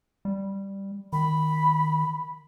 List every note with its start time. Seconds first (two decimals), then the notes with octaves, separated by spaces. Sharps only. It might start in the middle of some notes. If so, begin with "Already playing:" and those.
0.25 G3
1.13 D#3 B5